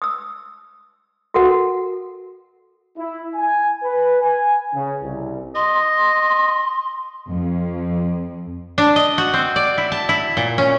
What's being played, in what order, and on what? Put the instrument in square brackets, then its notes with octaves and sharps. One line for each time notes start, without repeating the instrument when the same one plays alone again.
[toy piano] D#6 E6
F#4 A4 A#4 F#5
[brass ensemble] E4
G#5
B4
G#5
C#3
C2
[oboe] D#5 [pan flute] C6
[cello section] F2
[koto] D4
D#5
F#4
C4
D5
E4
A5
E4
A#2
C#4